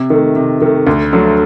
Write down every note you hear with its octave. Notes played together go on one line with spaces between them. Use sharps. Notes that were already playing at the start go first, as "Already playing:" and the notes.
Already playing: C3
D#3 A3
C3
D#3 A3
D2
D3 F#3 A3